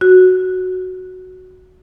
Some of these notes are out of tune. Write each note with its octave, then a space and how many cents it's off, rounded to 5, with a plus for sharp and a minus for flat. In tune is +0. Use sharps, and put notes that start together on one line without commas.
F#4 +0